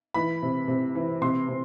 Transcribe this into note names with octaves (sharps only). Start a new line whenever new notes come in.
E3 B5
C3
C3
E3
C3 C6
C3